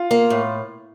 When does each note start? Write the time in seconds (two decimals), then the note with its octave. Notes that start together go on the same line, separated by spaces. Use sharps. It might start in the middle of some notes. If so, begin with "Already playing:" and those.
Already playing: F4
0.11 A#3
0.30 A2